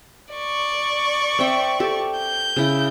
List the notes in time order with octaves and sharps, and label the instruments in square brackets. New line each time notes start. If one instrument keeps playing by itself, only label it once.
[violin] D5 C#6
[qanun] C4 E5 G5
G4 A4
[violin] G6
[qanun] C#3 E4